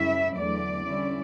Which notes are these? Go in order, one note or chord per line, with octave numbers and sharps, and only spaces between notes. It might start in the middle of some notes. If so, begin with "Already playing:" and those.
Already playing: F#2 C#3 G3 C#4 E4 E5
E2 D3 F#3 A3 D5
D3 G3 C#4 E4